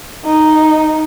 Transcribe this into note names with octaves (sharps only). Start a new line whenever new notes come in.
D#4